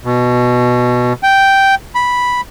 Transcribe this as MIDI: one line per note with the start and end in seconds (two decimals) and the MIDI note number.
0.05 1.13 47
1.23 1.75 79
1.95 2.41 83